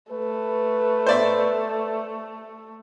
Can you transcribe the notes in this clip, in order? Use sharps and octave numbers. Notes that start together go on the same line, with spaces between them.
A3 B4
C5 D5 E5